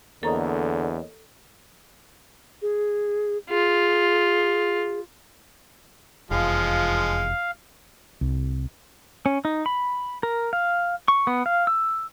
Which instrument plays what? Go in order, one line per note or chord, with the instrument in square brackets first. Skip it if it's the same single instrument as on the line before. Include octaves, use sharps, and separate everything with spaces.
[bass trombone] E2 [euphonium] D3 [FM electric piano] A#3 C#5 D#5 [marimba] A4 A#5
[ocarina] G#4
[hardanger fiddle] F4 [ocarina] G#4
[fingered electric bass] F1 E2 [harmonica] F3 G#3 [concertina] F5
[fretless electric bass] C2
[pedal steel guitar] C#4
D#4
B5
A#4
F5
C#6
B3
F5
E6